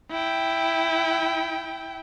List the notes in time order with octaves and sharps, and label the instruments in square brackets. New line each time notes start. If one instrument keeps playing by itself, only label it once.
[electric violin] E4 G5